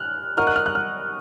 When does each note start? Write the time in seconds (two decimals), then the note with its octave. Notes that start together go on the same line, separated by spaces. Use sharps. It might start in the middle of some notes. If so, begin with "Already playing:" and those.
Already playing: F6 F#6
0.37 D#4 F#4 A#4 D#5 F6
0.47 F#6
0.56 F6
0.66 F#6
0.75 F6